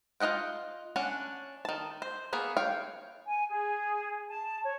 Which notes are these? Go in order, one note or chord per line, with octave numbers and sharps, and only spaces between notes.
F4 G#4 D#5 F#5 G5
C#4 D4 F#5
D#3 A5
C5
A#3 B3 G#4
C#5 F5 G5
G#5
G#4
A5
C#5